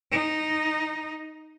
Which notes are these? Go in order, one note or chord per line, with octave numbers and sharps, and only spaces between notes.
D#4